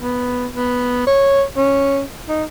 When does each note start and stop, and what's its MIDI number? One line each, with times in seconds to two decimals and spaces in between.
0.01 0.46 59
0.54 1.03 59
1.07 1.43 73
1.57 2.02 61
2.29 2.44 63